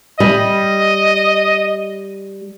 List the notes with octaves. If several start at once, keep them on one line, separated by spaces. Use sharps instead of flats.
G3 D#5